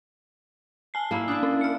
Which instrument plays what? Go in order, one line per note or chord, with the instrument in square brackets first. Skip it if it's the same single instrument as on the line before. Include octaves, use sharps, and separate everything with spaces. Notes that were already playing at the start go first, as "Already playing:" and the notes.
[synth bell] G#5 A5 C7
[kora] A#3 E4
[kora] D4 E4 [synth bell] D#6
[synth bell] C#4
F6 C#7